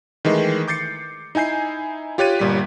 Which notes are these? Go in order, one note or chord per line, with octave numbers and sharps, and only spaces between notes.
D#3 E3 G#3 A3
D6 G6 A6 C7 C#7
D#4 E4 G#5 G6 C7
F4 G4 C#5 F#6 A6 D#7
G1 A#2 G3 B6